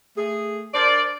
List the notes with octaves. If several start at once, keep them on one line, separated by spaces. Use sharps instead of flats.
A3 G#4
D4 A#4 C5 D5